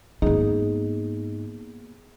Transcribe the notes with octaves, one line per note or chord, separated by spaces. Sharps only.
G#2 A#3 B3 D#4 G#4